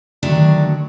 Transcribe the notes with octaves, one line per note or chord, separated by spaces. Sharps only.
D3 D#3 F#3 A3 D4